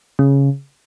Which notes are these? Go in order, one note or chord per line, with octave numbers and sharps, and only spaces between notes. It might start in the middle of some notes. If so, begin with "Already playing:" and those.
C#3